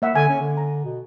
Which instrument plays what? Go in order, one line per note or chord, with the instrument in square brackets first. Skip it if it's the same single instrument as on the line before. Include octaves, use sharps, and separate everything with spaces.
[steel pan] A#3 E5 F#5
[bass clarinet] D3 [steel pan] G#5
[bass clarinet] C#4
D3
[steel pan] A#5
[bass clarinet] B2